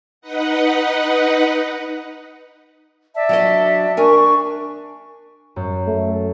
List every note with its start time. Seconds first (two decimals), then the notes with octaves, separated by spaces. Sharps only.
0.21 D#4 B4 D#5 F#5
3.15 D5 E5 A5
3.29 F#3 D4 D#5
3.97 D4 A#4 G#5 C#6
5.56 F#2
5.87 A3